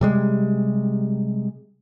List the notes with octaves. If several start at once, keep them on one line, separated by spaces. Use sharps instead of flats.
C3 G3 G#3